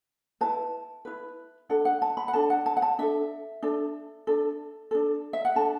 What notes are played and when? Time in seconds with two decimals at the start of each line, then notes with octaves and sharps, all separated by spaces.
0.41 E4 B4 A5
1.05 E4 B4
1.69 D4 A4 F#5
1.85 F#5
2.02 A5
2.17 B5
2.28 F#5
2.33 D4 A4 A5
2.50 F#5
2.66 A5
2.77 F#5
2.82 A5
2.99 D4 A4 E5
3.62 D4 A4
4.27 D4 A4
4.91 D4 A4
5.33 E5
5.45 F#5
5.55 D4 A4 A5